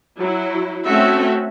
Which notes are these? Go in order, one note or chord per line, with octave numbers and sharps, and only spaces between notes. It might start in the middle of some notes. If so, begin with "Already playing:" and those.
F#3 E4
A3 C4 C#4 F#4 E5